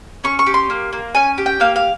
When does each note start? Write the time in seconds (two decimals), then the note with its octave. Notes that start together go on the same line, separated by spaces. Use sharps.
0.24 C#4 C#6
0.39 C#6
0.46 G4
0.54 C6
0.70 A#3
0.93 A#3
1.15 C#4 G#5
1.38 G4
1.46 G5
1.60 A#3 F5
1.76 F5